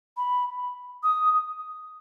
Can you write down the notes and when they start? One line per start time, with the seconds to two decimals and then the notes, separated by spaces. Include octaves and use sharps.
0.17 B5
1.03 D#6